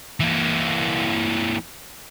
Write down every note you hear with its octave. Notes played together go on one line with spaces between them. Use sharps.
E3 A#3